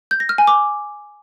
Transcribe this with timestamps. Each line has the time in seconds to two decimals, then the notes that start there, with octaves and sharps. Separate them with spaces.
0.11 G6
0.20 A#6
0.29 F6
0.38 G#5
0.47 D6